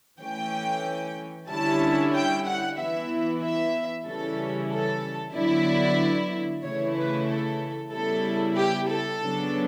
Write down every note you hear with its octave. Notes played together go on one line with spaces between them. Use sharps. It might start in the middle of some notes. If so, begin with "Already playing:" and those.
E3 A3 C#4 G5
D3 G3 C#4 E4 A5
G5
F#5
E3 B3 E4 E5
E5
C#3 E3 G3 C#4 E4 A4
A4
D3 F#3 B3 E4 D5
C#3 E3 A3 E4 C#5
B4
A4
C#3 G3 B3 E4 A4
G4
A4
C#3 F#3 B3 D4